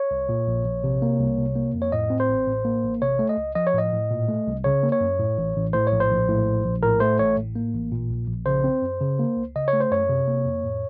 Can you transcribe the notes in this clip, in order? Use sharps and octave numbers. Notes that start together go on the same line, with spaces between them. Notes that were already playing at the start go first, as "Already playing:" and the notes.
Already playing: C#5
C2
A#2
A#1
A#1
C3
A#3
C2
C3
A#3
F2
C#5
A2 D#5
C4
C5
A1
A2
A#3
A1
C3 C#5
A3
D#5
C#2
F3 D#5
C#5
A2 D#5
A2
A#2
A3
C2
C#3 C#5
A#3
C#5
F#2
A2
A1
A1
A2 C5
C#5
A#1
C5
A#1
A2
A#1
A#1
A2 A#4
A3 C5
A1 C#5
A2
A#3
A1
A#2
A#1
A#1
C#3 C5
C4
F#2
C#3
A#3
C#2
C#3 D#5
C#5
A3
C5
F#2 C#5
C3
A#3
F2
A2